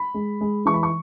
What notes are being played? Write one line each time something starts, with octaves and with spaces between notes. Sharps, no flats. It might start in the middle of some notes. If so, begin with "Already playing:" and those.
Already playing: B5
G#3
G#3
E3 C#6
B5
C#6